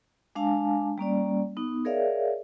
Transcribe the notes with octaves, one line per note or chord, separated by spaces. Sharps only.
G#3 D4 F5 G#5 A5 D6
G3 A#3 C#4 D5
B3 D#4
G#4 A#4 C#5 D5 E5 F5